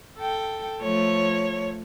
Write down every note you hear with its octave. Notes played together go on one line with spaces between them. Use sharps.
A4 G5
F3 A3 C#5